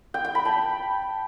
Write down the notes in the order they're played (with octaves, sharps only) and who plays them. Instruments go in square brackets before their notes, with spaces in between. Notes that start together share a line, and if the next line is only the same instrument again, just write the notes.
[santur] G5
G5
B5
A5